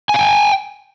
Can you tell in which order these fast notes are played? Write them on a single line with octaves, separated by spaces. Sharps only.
G#5 F5 G5